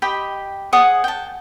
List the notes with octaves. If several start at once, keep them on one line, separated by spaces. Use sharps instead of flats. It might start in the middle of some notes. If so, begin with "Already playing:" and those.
G4 D#5 G5 B5
G#4 C#5 F#5 D#6
G5 A5